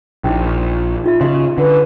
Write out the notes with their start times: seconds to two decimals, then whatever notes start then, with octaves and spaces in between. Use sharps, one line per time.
0.24 A#1 C#4 D#4 E4
1.04 D#4 F4 E5
1.21 C#3 F#4 D#5 C6
1.58 D3 B4